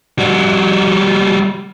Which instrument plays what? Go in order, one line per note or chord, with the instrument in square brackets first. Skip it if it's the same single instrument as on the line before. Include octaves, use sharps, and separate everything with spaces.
[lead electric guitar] G3 F#4